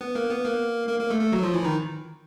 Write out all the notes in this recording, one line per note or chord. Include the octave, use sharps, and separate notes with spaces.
B3 B4
A#3 A#4
B3 B4
A#3 A#4
A#3 A#4
A#3 A#4
A3 A4
A3 A4
F#3 F#4
F3 F4
E3 E4
D#3 D#4